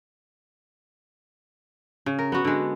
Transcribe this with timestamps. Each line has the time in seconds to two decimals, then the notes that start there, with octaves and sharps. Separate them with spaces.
2.06 C#3
2.19 A#4
2.32 B3 F#4
2.45 D3 G#3